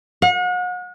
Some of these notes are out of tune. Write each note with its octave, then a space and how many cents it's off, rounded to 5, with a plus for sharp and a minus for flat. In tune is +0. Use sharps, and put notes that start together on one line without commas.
F#5 -40